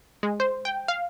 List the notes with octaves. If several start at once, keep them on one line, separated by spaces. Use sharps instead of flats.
G#3
C5
G5
F5